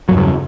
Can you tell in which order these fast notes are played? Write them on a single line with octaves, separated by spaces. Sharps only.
F#3 G2 E2 C#3